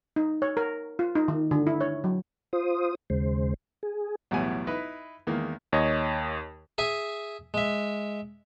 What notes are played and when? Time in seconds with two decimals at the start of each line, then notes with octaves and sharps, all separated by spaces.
0.16 D#4
0.42 C#5
0.57 A#4
0.99 F4
1.15 D#4
1.28 D#3
1.51 D3
1.67 E4
1.81 C#5
2.04 F#3
2.53 F4 C5 D#6
3.10 D#2 C#3 G#3 C5
3.83 G#4
4.31 B1 E2 A2 G3 F#5 G#5
4.67 D#4 E4 B4
5.27 E2 D#3 G#3 A#3
5.73 D#2 C#5 D#5
6.78 G#4 E5 G#5
7.54 G#3 E5